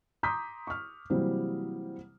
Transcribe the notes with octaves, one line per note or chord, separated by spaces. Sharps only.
A#5 C6 D6 D#6 G6 B6
C#6 F6
C3 E3 F#3 G3 A#3 C4